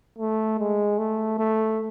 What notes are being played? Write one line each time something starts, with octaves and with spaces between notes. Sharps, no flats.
A3
G#3
A3
A3